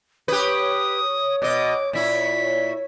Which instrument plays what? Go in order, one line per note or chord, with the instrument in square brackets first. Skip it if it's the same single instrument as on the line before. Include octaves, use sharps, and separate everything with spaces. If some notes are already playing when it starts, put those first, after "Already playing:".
[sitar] G4 B4 [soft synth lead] C#5 [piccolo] D#6
[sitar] B2 D#5 [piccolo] D6
[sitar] A#2 E4 [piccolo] B6